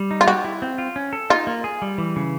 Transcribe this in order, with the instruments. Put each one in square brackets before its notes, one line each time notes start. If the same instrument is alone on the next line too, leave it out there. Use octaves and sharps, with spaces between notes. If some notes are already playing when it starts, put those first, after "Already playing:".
Already playing: [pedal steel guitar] G3
D#4
[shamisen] F4
[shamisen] F#4 [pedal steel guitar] G4
[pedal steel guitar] E4
C4
F4
C#4
A4
[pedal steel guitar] D#4 [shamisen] F4
[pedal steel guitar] A#3
G#4
G3
E3
C#3